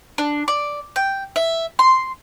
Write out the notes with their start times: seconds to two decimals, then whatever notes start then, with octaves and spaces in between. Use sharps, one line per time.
0.18 D4
0.48 D5
0.96 G5
1.36 E5
1.79 C6